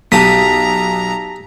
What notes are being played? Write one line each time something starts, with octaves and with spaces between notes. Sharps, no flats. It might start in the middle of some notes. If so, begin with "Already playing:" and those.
B1 G4 A5 A#5 D#6 B6